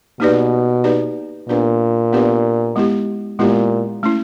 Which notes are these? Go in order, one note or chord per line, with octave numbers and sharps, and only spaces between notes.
B2 A#3 D#4 G4 B4 D5
A#3 D#4 G4 B4 D5
A#2 B3 D4 G4 B4 D5
B3 D4 G4 B4 D5
G#3 B3 E4 G4
A#2 G#3 B3 E4 G4
A3 C#4 E4